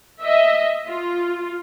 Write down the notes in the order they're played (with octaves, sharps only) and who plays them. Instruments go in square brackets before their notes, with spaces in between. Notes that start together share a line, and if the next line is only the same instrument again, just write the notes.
[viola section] D#5 E5
F4